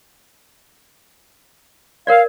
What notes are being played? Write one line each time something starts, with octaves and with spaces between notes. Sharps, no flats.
A#4 C#5 D5 F5